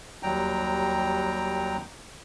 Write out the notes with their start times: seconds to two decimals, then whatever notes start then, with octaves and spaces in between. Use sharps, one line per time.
0.23 D#2 F#3 G3 G5 A#5